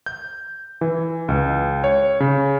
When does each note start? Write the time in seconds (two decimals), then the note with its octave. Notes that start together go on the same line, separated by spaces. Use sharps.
0.06 G6
0.81 E3
1.28 C#2
1.84 C#5
2.20 C#3